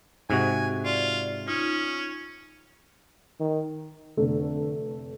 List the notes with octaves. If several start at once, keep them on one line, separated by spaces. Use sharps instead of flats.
G#2 C3 F#4 G#5
F4 D5
C#4 D#4 F4
D#3
F1 D3 A3